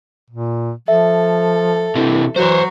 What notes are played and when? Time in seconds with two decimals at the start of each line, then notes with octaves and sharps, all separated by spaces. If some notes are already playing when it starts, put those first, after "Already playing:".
0.30 A#2
0.88 F3 A4 E5
1.96 C3 E3
2.36 E3 F#3 F#4 C5 C#5